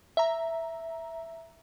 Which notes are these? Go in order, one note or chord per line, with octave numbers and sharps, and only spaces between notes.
E5 A#5